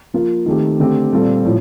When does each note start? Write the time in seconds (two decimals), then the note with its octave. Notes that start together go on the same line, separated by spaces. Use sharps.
0.14 F3 A#3 F4
0.46 D#3 A3 C4 G4
0.79 D3 A3 C4 G4
1.12 A#2 G3 C4 F4 A4
1.45 A2 F3